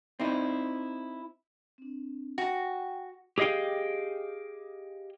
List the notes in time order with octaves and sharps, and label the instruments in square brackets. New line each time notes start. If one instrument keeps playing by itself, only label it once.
[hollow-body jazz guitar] C4 D#4 E4
[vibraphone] C4 D4
[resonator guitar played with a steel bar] F#4 [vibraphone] G5 G#5
[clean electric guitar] G4 G#4 D#5 F5 G5